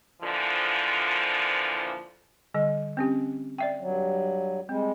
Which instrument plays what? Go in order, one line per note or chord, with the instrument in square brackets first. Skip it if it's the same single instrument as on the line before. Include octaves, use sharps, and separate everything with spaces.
[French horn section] F2 A#2 D3 E3 F3
[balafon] D3 G3 D#5
C4 C#4 G4
D5 E5 G5
[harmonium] G2 F#3
[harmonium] G3 G#3 [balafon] C4